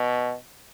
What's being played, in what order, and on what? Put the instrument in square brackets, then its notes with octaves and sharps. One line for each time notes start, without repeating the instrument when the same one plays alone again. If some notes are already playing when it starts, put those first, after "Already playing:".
Already playing: [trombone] B2